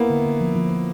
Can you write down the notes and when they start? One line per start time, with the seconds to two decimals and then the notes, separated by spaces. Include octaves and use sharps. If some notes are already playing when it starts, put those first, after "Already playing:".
Already playing: A#3 B3 E4
0.10 D3
0.25 D3
0.41 F3
0.56 F3
0.71 F3